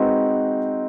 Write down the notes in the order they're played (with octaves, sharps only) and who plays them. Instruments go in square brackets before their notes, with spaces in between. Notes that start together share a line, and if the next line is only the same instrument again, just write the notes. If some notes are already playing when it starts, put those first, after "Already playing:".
Already playing: [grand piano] G#3 C4 D#4 F#4 B4